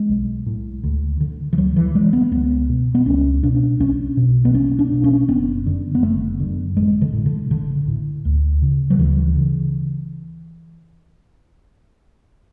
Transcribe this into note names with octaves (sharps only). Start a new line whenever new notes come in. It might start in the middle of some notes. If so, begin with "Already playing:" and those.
Already playing: G#3
B1
A2
D2
D3
E3
D2 F#3
E3
D3 G#3
B3
C#2 B3
B2
B3
C#2 C#4
B2 D4
B1 C#4
B2
B3
B1 C#4
D4
B2
C#4
F#1 B3
F#2 D3
B3
F#1 A3
F#2 D3
A1 G#3
D3
A2
D3
A1 D3
A2
D2
C#3
F#3
D2 E3
C#3